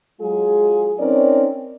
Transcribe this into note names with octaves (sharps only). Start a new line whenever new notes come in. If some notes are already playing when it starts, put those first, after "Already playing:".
F#3 G#3 F4 G#4
C4 C#4 D#4 A#4 C#5 D5